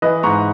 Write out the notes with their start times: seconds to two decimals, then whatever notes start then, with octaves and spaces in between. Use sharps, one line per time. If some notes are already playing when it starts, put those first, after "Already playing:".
0.02 E3 B4 D#5
0.23 G#2 A#5 C#6